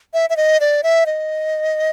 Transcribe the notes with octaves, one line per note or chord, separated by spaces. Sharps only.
E5
E5
D#5
D5
E5
D#5